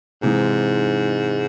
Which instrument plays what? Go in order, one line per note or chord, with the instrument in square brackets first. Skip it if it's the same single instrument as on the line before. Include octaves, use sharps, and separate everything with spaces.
[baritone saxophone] G#2 [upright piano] C3 E3 G#3 D#4